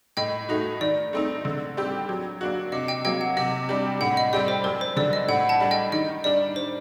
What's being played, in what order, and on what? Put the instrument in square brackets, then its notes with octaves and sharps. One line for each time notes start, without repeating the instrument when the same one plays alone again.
[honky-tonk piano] A2 [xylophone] D#5 G5
[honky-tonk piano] A3 D#4 F#4
[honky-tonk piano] D#3 [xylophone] D5
[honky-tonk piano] A3 C4 D#4
D3
G3 C4 G4
F#3
A#3 D4 F#4
[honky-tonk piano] C3 [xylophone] D#5
[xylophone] D#5 G5
[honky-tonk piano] F#3 A#3 [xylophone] D#5 G5
[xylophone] F#5
[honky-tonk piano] C3 [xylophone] D#5
[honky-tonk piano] G3 D4 G4
[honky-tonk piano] A2 [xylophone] F#5
[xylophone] D#5
[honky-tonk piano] G3 C4 G4 [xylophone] D5
[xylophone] C5
[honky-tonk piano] F#2 [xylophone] A#4
[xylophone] C5
[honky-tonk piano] D3 G3 [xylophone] D5
[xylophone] D#5
[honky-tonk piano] A2 [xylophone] F#5
[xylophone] F#5 A5
[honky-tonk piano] G3 D4
[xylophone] D#5 G5
[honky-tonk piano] D#3 [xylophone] D#5
[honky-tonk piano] G3 D4 [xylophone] D5
[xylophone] C5